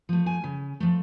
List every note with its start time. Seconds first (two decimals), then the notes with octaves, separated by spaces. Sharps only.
0.09 F3 A3
0.26 G#5
0.44 C#3
0.80 F3 A3